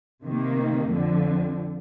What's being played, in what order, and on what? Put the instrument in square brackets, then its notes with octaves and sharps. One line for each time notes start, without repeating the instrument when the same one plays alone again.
[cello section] C3 D#3 A#3
F2 D3 F3